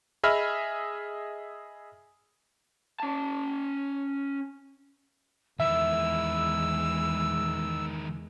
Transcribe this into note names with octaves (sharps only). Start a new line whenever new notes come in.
G#4 D#5 E5 B5 F6
C#4 A5
E2 D#3 G#3 E4 E5 E6